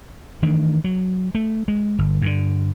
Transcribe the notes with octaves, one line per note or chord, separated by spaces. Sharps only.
D#3 E3 A3 D4
F#3
A3
G#3
G1
G2 B2 D3